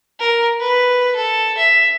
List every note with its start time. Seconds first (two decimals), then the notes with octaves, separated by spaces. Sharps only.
0.19 A#4
0.60 B4
1.16 A4
1.57 E5